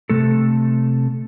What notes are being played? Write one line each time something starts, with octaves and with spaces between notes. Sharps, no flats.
C3 A3 A4